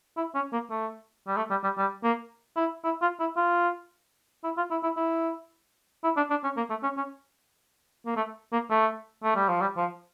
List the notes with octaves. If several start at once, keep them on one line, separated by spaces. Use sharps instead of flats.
E4
C#4
A#3
A3
G3
A3
G3
G3
G3
A#3
E4
E4
F4
E4
F4
E4
F4
E4
E4
E4
E4
D4
D4
C#4
A#3
A3
C#4
C#4
A#3
A3
A#3
A3
A3
G3
F3
G3
F3